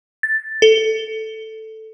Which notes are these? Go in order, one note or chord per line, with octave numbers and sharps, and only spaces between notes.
A6
A4